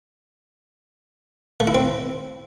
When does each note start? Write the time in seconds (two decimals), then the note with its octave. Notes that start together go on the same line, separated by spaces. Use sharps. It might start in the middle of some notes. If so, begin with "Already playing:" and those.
1.60 A3
1.67 E4
1.75 C4